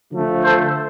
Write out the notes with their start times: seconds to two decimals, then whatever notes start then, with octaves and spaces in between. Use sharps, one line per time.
0.11 D3 F3 A3
0.44 A4 C5